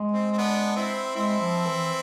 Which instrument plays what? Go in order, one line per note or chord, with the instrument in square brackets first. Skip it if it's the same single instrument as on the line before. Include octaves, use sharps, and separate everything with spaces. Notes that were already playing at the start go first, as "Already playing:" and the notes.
Already playing: [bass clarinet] G#3
[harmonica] C4
C4
B3 D4
C4 E4
[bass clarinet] G#3 [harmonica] C4 E4
[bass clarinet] F3
E3